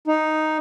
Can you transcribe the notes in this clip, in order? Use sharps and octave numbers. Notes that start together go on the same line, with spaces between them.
D#4